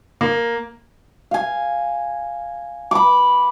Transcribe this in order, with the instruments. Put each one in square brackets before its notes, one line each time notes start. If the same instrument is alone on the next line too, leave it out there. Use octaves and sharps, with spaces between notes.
[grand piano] A#3
[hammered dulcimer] F5 G#5
B5 D6